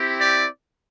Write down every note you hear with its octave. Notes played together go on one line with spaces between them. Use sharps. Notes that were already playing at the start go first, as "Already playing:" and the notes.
Already playing: C4 E4 G4
D5